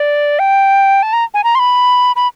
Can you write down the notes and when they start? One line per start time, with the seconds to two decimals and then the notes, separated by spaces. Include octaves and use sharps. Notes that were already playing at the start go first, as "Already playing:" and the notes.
Already playing: D5
0.39 G5
1.03 A5
1.13 A#5
1.34 G#5
1.44 A#5
1.55 C6
1.59 B5
2.16 B5